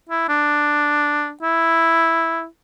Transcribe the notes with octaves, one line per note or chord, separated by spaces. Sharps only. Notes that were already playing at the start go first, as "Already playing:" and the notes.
E4
D4
E4